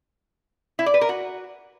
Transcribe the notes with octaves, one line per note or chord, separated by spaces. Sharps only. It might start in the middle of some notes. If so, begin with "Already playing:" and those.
E4
D5
B4
A#4
F#4